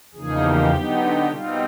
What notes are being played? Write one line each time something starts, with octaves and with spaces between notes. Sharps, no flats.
E2 C#3 F3 A#3 D#4 G#4
G4
D3 F#3 B3 D#4
B2 G3 C4 D#4 F4